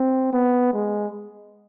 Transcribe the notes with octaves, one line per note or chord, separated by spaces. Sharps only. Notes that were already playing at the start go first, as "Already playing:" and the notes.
Already playing: C4
B3
G#3